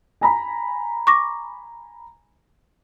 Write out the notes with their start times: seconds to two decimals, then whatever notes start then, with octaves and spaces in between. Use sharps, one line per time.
0.21 G#5 A#5 B5
1.07 C#6 D6 A#6